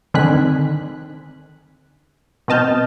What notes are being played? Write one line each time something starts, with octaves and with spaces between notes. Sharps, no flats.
D3 D#3 C4 G#5 F#6 B6
B2 C4 D#5 A5 F6 G6